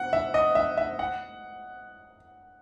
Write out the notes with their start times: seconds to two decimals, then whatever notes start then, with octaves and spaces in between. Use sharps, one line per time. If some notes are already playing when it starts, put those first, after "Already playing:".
Already playing: F#5
0.13 E5
0.34 D#5
0.55 E5
0.78 E5
0.99 F#5